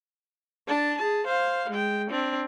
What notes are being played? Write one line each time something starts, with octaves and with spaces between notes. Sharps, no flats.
D4 A5
G#4 A5
C5 F5
G#3 G5
C4 D4